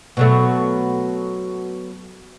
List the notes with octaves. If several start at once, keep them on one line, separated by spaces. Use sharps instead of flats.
B2 F#3 A3